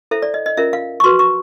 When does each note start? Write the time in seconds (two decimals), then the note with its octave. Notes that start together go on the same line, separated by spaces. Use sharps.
0.11 E4 A4 C5 E5
0.22 D5
0.34 D#5
0.46 D#5
0.57 C#4 F4 A#4 E5
0.73 F5
1.00 C#6
1.04 F#4 B4 C6
1.19 C#6